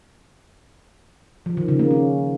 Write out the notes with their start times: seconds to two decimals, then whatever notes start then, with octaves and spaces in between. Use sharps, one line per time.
1.46 F3
1.57 D#3
1.68 C#3
1.79 A#3
1.91 C#4